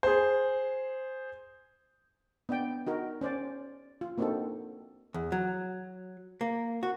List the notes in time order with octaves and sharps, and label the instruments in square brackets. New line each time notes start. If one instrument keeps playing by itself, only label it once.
[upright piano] G#4 C5
[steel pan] B3 D4 D5 G5
D#4 F#4 A#4
C#4 C5 D5
F4
A#3 C4 D4 D#4 F#4 A4
[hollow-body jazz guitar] E2
F#3
A#3
F#4